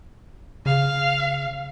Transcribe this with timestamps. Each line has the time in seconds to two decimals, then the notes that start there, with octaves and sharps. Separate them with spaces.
0.66 C#3 F5